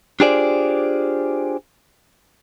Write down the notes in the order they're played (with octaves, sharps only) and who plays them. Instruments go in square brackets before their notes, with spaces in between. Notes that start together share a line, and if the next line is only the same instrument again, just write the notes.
[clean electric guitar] D4 F4 G4 G#4 C5 D5